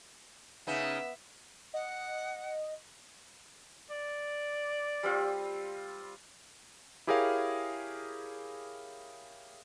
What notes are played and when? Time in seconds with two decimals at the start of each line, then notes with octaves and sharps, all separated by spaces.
0.67 C#3 B3 D#4 E5
1.74 D#5 F#5
3.90 D5
5.03 G3 C4 F4
7.07 E4 G4 G#4 A#4 C#5 F5